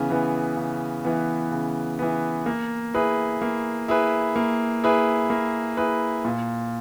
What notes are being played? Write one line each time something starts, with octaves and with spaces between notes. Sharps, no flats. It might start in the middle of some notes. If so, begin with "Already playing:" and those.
Already playing: C#3 E3 B3
E3 B3
C#3
E3 B3
C#3
E3 B3
A#3
E4 G#4 B4
A#3
E4 G#4 B4
A#3
E4 G#4 B4
A#3
E4 G#4 B4
A#2